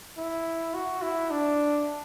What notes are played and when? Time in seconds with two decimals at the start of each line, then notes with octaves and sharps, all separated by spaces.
0.18 E4
0.74 F#4
1.02 E4
1.31 D4